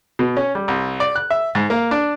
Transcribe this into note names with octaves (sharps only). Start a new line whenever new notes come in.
B2
C#4
G3
C2
D5
F#6
E5
G#2
A#3
D4